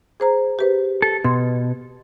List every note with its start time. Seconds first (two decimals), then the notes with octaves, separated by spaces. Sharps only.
0.20 G#4 C5 A#5
0.59 G4 B4 C5
1.02 A4
1.24 B2 C6